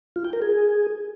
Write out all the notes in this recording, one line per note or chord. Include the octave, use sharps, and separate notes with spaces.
F4
G5
A#4
G#4